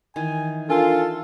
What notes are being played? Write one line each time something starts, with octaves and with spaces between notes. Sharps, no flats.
D#3 E3 G#5
D4 F4 A4 A#4 G#5